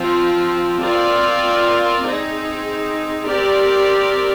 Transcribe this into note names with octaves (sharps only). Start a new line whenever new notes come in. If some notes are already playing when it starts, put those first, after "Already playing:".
Already playing: F3 C4 F4
C4 F4 A#4 D5
C4 D#4 G#4
C4 G4 A#4 D5